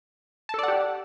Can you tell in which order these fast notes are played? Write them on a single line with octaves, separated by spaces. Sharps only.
A5 A4 D5 F#5 G4